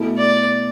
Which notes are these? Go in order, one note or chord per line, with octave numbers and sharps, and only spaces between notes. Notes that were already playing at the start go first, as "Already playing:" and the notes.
Already playing: B2 A3 E4 A4
D5